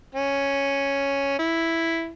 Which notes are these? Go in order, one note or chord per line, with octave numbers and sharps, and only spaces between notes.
C#4
E4